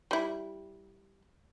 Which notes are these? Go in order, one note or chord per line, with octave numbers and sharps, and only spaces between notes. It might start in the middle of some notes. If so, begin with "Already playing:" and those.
G3 E4